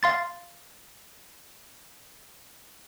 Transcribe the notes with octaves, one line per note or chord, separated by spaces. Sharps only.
F5 C6 A6